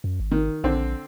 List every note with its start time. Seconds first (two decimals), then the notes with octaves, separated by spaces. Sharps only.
0.04 F#2
0.20 G#1
0.31 D#3
0.64 A#1 D3 C4